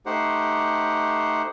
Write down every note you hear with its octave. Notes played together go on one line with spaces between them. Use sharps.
A3 D#4 G4 C5 F#5